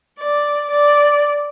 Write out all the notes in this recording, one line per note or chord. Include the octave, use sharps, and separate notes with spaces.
D5
D5